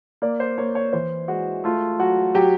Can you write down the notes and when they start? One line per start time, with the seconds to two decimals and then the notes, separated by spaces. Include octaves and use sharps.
0.22 A#3 D5
0.40 C5
0.58 A#3 C#5
0.75 C#5
0.93 E3 C5
1.28 G#3 F#4
1.64 A3 F4
1.99 F#3 F#4
2.35 F#3 G4